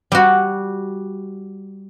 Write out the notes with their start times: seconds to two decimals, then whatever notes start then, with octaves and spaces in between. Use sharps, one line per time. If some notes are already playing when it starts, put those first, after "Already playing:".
0.12 G3 F#4